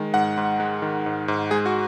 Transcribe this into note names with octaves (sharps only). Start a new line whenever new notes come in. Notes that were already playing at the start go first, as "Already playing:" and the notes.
Already playing: D#3 G#3
G#2 F#5
G#2
G#3
D#3
G#2
G#2
G#3 G#4
F#4